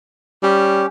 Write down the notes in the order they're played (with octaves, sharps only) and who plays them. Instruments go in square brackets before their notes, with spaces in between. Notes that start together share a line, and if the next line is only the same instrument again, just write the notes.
[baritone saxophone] G3 [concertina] C#4 G4